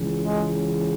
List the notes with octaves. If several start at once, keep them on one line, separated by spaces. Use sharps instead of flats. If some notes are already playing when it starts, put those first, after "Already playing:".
Already playing: C#2 C#3 E3
G#3